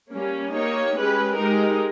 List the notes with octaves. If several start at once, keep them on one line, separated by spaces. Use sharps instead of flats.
G3 A#3 C#4
A#3 D#4 G4 C#5
G#3 C#4 G4 B4
G#3 D#4 G4 A#4